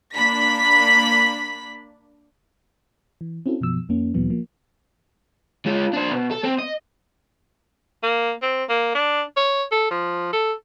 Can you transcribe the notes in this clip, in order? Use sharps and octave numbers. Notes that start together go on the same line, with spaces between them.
A#3 D4 B5 B6
E3
C4 C#4 E4 F#4 A4
F#2 B2 F3 E6
F2 A#3 C#4
D2 A#2 E3 F#3 B3
F3 A#3
G#3 F4
D4 C5
B2
A4
C4
D#5
A#3
C4
A#3
D4
C#5
A4
F3
A4